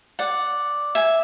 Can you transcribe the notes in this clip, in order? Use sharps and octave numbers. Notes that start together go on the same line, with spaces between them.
D5 F#5
E5 G#5